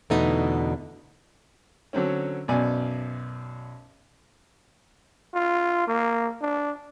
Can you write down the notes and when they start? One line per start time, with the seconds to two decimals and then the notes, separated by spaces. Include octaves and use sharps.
0.10 E2 B2 D3 A3 B3 D#4
1.93 D3 F#3 C4 C#4
2.48 B1 F#2 B2 D5 G#5
5.34 F4
5.87 A#3
6.41 D4